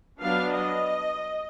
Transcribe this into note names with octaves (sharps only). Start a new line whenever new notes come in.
F#3 B3 D4 F5
D#5